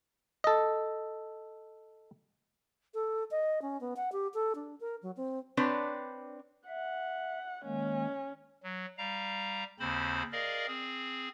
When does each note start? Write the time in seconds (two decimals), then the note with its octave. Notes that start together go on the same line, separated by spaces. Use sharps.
0.44 A4 D#5
2.94 A4
3.31 D#5
3.62 C#4
3.81 B3
3.96 F#5
4.12 G4
4.34 A4
4.55 D4
4.81 A#4
5.03 F#3
5.17 C4
5.57 C4 D4 B4 C#5
6.68 E5 F#5
7.65 D#3 G#3 A#3 C#4
8.64 F#3
8.98 G3 F5 A#5
9.80 D#2 C#3 C4 C5 B5
10.32 G#4 A#4 D5 D#5 F5
10.68 C4 G#4